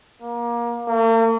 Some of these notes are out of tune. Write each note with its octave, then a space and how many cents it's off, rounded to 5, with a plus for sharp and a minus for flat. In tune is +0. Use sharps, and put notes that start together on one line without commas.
A#3 +25
A#3 -45